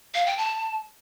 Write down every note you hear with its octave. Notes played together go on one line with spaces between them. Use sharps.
F5
G5
A5